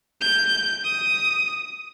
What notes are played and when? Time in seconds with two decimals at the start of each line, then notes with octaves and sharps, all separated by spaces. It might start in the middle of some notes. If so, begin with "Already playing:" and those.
0.21 G6
0.84 D#6